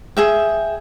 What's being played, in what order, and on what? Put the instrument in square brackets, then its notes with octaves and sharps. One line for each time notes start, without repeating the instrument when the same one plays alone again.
[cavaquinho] G#4 E5 G5